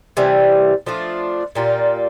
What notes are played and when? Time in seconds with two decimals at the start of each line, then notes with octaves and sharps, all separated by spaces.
0.17 C3 E3 G3
0.86 F3 A3 D4 F4
1.55 A#2 G3 A#3 F4